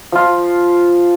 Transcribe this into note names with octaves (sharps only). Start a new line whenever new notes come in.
F3 F4